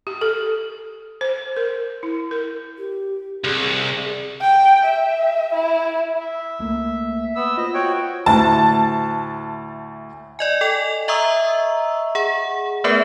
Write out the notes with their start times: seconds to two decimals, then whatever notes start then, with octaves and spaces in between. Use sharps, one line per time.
0.07 G4
0.21 A4
1.21 C5
1.57 A#4
2.03 E4
2.31 A#4
2.78 G4
3.44 C2 G#4
4.41 G5
4.84 E5
5.53 E4
6.20 E5
6.59 C#2 A3 A#3
7.36 B3 E6
7.57 F4 C5 D#5
7.74 F#4 C#5 G5
8.26 D2 A2 A5
10.39 D5 D#5 G#5
10.61 A4 G5 F7
11.08 D#5 E5 A#5 C#6 D#6 E6
12.15 G#4 F#5
12.84 A3 B3 A#4 B4 E5